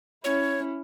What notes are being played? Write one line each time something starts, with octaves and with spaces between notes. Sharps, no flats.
C#4 E4 C#5